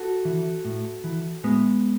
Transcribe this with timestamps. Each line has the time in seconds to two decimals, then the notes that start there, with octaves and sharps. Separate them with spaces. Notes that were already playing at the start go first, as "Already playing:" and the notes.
Already playing: F#4 A4
0.25 E3
0.65 A2
1.04 E3
1.44 A2 G#3 B3